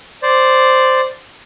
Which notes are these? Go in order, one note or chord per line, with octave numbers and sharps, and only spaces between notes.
C5 D5